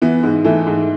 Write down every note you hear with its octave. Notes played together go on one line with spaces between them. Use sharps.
E3 B3
G#2
E3 A3
G#2